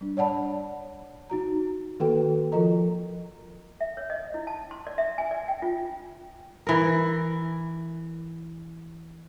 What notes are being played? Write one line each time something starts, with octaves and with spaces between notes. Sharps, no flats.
G3 D4
C#5 D5 F#5 A5 B5
D#4 F#4 A#5
D#3 A#3 F#4 A4 B4 G5
F3 F4 A4 A#4 D#5 A#5
E5
C#5
D#5
E4
A5
C6
D5
E5
G#5
D5
G5
F4
E3 A#4